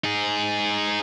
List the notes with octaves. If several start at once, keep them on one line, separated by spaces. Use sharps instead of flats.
D#4 G#4